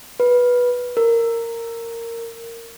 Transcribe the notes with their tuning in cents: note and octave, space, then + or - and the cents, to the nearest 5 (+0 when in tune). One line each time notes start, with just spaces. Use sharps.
B4 -15
A#4 -15